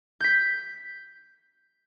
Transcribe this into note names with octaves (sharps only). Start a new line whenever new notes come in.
G6 B6